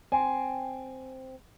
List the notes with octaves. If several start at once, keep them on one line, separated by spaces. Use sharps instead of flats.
C4 G#5